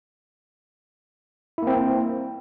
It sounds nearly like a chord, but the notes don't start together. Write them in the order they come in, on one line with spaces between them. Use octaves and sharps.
E4 A#3 C4